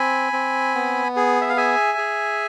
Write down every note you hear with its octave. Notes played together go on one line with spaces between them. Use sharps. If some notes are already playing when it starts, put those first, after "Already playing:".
Already playing: C4 G#5 B5
C4
B3
G#4
E5
F5
G#4 E5 G#5
G#4